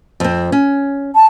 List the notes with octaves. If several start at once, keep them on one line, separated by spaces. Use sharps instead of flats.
F2 C4
C#4
A5